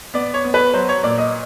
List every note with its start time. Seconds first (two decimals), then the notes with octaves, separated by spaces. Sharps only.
0.14 B3 D5
0.34 C#5
0.44 B3
0.54 B4
0.73 F#3 C5
0.89 C#5
1.03 A#2 D5
1.18 D#5